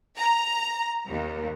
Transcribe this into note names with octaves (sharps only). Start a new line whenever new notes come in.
A#5
D#2